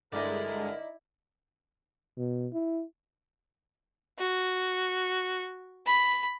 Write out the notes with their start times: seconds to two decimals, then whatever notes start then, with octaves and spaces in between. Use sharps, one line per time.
0.12 G2 D3 G#3 D#4 E4 A#4 D5
2.18 B2
2.53 E4
4.18 F#4
5.86 B5